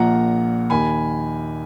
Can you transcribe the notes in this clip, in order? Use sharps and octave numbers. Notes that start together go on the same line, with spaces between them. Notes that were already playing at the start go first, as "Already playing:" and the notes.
Already playing: A#1 A#2 F3 F#5 A#5
D#2 D#3 G#5 B5